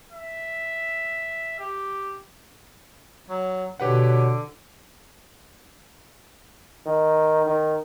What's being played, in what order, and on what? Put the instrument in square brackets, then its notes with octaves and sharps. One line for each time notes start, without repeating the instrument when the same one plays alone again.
[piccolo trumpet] E5
G4
[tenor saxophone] F#3
[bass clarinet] B2 [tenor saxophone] D3 [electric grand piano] G4 B4 F#5 [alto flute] C#5
[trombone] D#3
D#3